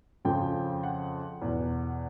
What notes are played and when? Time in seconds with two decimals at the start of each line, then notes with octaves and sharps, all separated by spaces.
0.25 F2 C#3 F3 G5
0.83 F#5
1.42 E2 B2